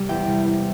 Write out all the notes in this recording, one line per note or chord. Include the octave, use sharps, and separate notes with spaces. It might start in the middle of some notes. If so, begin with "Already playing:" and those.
Already playing: C3 G3
E2 G5
C3 G3
E2